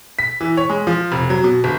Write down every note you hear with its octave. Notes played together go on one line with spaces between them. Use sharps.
B6
E3
C#5
G#3
F3
F1
F#3
B2
G1